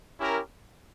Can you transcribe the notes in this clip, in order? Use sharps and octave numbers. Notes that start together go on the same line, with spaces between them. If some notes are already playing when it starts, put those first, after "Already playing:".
C#4 E4 G4 A#4